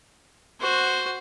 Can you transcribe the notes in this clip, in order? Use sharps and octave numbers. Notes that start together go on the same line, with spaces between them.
F#4 C5